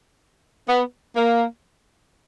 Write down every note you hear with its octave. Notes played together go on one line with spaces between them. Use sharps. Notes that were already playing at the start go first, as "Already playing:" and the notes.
B3
A#3